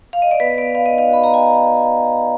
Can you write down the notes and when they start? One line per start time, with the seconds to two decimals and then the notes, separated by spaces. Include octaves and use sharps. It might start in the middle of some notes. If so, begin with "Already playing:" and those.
0.13 F5
0.22 D#5
0.31 D5
0.40 B3 B4
0.58 B3 D5
0.75 B3 F5
0.86 D#5
0.92 D#4
0.98 F5
1.09 F#4 B5
1.24 B3 A#5
1.34 G#5